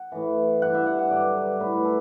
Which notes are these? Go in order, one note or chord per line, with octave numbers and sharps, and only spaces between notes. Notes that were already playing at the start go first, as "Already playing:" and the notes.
Already playing: F#5
A2 E3
G2 E3 F#5
E5
F#5
F#5
G2 D3 F#3 D5
A2 F#3 B4
A4